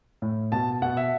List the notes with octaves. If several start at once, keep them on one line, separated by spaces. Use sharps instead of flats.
A2
B2 A5
B2 F#5
E5